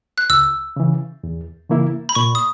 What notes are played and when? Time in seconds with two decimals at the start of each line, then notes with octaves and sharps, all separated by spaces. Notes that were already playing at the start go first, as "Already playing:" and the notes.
0.18 F#6
0.30 C#2 E6
0.76 C#3 E3
1.24 E2
1.70 C#3 E3 A#3 E4
2.09 B5
2.15 A#2 C#6
2.35 D#6